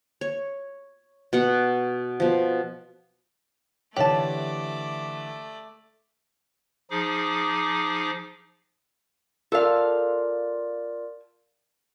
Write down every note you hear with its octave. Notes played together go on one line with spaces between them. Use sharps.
C#5
B2 F#5
B2 F3
D3 E3 A3 G4 C#5 D5 A5 F#7
F3 D#4 G#4 D6
F4 A4 A#4 D5 F5